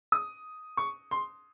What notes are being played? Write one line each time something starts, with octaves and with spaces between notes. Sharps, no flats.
D#6
C#6
C6